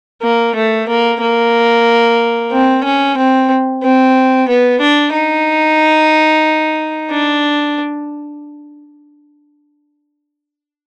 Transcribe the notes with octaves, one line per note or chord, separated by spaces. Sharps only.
A#3
A3
A#3
A#3
C4
C#4
C4
C4
B3
D4
D#4
D4